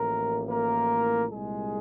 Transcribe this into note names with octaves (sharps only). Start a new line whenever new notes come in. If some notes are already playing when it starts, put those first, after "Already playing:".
Already playing: A1 A2 F3 A#3 A#4
A#3 A#4
C2 A#2 G3 G#3 G#4